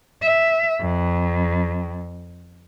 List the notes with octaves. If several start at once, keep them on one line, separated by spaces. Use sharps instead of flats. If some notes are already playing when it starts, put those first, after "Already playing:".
E5
F2